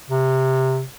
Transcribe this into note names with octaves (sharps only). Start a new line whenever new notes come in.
C3